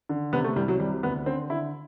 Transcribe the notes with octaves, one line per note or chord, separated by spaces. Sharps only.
D3
C3 B3
A3
C2 G3
F#3
C3 G3
D2 B3
D3 C4
D3 E4